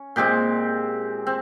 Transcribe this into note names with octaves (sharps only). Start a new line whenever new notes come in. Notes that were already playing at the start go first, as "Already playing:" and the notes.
Already playing: C#4
A#2 G#3 C4 G4
C4